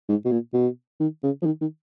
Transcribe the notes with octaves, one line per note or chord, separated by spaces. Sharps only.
G#2
B2
A#2
B2
D#3
C#3
F3
D#3
D#3